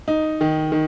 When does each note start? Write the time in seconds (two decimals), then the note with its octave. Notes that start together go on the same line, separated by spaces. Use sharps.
0.08 D#4
0.41 D#3
0.72 D#3